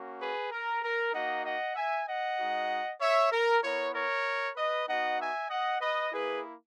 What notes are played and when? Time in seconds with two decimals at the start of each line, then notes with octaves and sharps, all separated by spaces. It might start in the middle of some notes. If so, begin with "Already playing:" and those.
Already playing: A#3 C#4 F#4
0.20 G#4 B4
0.51 A#4
0.83 A#4
1.13 A#3 D#4 F#4 D#5 F#5
1.44 D#5 F#5
1.76 E5 G#5
2.07 D#5 F#5
2.39 G#3 D#4 F#4
3.01 C#5 E5
3.32 A#4
3.63 B3 E4 A#4 C#5
3.94 A#4 C#5
4.56 B4 D#5
4.87 B3 D#4 F#4 D#5 F#5
5.19 E5 G#5
5.50 D#5 F#5
5.81 B4 D#5
6.12 A#3 E4 G#4 B4